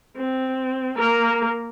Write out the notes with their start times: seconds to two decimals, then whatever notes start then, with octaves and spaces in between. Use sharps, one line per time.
0.17 C4
0.96 A#3 A#4